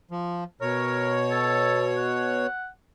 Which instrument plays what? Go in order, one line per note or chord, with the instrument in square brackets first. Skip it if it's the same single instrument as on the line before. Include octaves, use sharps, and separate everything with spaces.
[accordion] F3
[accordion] B2 C#5 [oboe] A#4
[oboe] A4
F#5